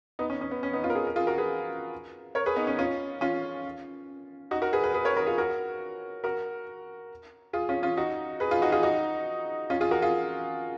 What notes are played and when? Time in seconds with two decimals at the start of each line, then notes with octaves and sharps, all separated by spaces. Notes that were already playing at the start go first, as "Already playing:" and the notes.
0.19 B3 D#4
0.30 C#4
0.41 C#4
0.51 B3
0.63 C#4
0.73 B3 D#4
0.83 C#4 F4
0.90 A#4
0.95 F4 G#4
1.07 A#4
1.16 F4 G#4
1.27 F#4 A#4
1.38 G#4 B4
2.35 A#4 C#5
2.46 G#4 B4
2.56 B3 D#4
2.67 C#4
2.78 C#4 F4
3.21 C#4 F4
4.51 D#4 F#4
4.62 F#4 A#4
4.73 G#4 B4
4.83 G#4 B4
4.94 G#4 B4
5.05 A#4 C#5
5.17 F#4 A#4
5.26 F4 G#4
5.38 F#4 A#4
6.24 F#4 A#4
7.53 F4 G#4
7.69 C#4 F4
7.83 C#4 F4
7.97 D#4 F#4
8.40 G#4 B4
8.51 F4 G#4
8.62 D#4 F#4
8.72 F4 G#4
8.83 D#4 F#4
9.70 C#4 F4
9.80 F4 G#4
9.91 F#4 A#4
10.02 F4 G#4